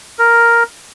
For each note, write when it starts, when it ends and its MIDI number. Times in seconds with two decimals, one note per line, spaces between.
0.19 0.63 70